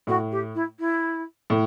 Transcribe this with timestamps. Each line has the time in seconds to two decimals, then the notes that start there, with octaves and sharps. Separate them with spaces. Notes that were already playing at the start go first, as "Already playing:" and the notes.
0.07 A2 F#4
0.31 G4
0.55 E4
0.79 E4
1.50 A2